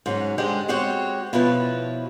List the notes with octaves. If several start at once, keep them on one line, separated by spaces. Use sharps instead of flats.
G#2 F#3 C#4
D3 G#3 G4 C5
G#3 C4 F#4 G4 C#5
B2 F3 E4 B4 C#5